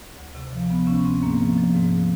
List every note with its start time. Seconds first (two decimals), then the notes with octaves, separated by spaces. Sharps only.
0.17 D2
0.35 C3
0.53 F3
0.70 D2 B3
0.87 C3 C#4
1.05 D2 C4
1.23 G#2 A#3
1.40 F3
1.58 F3
1.75 G#2
1.93 F3